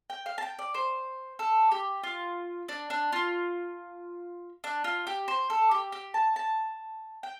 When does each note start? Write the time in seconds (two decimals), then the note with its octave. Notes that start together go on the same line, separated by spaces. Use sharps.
0.10 G5
0.26 F5
0.38 A5
0.43 G5
0.59 D5
0.74 C5
1.39 A4
1.71 G4
2.03 F4
2.69 D4
2.90 D4
3.12 F4
4.64 D4
4.84 F4
5.07 G4
5.28 C5
5.50 A4
5.71 G4
5.92 G4
6.14 A5
6.36 A5
7.23 G5